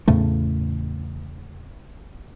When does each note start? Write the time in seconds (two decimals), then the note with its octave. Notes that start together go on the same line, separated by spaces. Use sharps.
0.08 E2 A2 C#3 A3